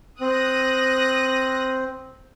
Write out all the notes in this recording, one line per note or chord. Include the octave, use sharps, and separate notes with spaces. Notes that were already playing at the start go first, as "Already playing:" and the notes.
C4 D#6 F#6 A#6